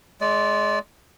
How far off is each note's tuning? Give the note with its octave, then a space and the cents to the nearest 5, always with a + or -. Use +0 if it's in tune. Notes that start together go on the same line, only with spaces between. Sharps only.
G#3 +20 D5 -20